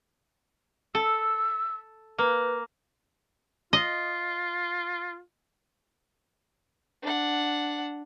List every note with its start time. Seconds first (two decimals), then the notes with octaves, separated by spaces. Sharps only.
0.95 A4 E6
2.18 A#3 B4
3.73 F4 D#5
7.02 D4 F#5